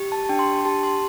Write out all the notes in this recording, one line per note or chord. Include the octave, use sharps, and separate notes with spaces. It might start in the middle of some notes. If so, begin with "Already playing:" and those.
Already playing: G4
A5
A5
D4 G5
C6
A5
C6
G4 A5
C6